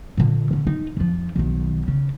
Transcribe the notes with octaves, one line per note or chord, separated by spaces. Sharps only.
A#2 D3
D3 C#4
D#4
F2 F3
B1 D#3
C#3